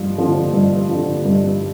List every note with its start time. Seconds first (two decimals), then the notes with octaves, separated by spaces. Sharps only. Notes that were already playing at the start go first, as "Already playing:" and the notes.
Already playing: G2 F3
0.17 D3 F3
0.53 G2
0.89 D3 F3
1.25 G2